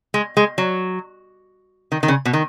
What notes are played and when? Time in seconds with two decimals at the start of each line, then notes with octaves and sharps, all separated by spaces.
0.14 G#3
0.37 G#3
0.58 F#3
1.92 D#3
2.03 D#3
2.08 C#3
2.25 B2
2.33 D#3